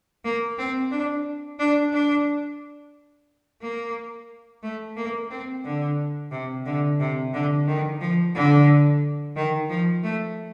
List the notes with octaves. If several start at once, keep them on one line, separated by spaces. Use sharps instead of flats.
A#3
C4
D4
D4
D4
A#3
A3
A#3
C4
D3
C3
D3
C3
D3
D#3
F3
D3
D#3
F3
A3